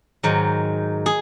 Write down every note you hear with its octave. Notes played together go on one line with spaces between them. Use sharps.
G#2 D#3 F#3
G#4